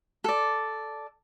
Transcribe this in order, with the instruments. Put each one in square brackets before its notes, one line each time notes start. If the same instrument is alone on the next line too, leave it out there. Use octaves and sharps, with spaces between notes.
[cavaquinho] A4 D5